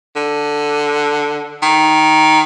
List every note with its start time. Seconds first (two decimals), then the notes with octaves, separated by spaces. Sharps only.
0.16 D3
1.62 D#3